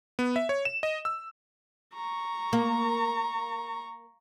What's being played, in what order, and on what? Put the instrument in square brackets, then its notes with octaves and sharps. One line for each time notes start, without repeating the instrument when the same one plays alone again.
[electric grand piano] B3
E5
C#5
E7
D#5
E6
[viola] A#5 C#6
[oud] A#3